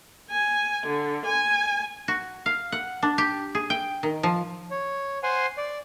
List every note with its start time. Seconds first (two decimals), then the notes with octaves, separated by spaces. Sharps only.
0.31 G#5
0.86 D3
1.25 G#5
2.08 F#4
2.46 F5
2.72 F#5
3.03 D4
3.18 G4
3.55 G#4
3.70 G5
4.03 D#3
4.23 F3
4.71 C#5
5.23 C5 F#5 G#5 C6
5.58 D5